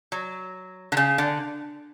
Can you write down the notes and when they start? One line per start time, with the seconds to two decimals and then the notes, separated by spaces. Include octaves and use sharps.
0.12 F#3
0.92 D3
0.97 C#3
1.18 D3